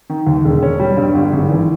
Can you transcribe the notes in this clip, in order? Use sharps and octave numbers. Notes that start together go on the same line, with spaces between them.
D#3
D#2
E1
C#4
G3
G2
G1
G#1
E3